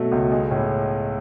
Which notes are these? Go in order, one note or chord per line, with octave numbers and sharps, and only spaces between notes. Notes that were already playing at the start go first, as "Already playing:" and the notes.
Already playing: B2 F#3 A3
C#2
G#3
A2